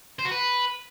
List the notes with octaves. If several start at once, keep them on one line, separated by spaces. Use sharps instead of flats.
C5
F#4
B4